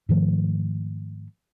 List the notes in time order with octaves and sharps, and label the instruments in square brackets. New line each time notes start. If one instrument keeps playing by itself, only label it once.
[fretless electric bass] G#2 D#3 F3 A3